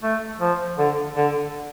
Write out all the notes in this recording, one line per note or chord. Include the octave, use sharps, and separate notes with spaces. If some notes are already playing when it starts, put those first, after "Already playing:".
A3
F3
D3
D3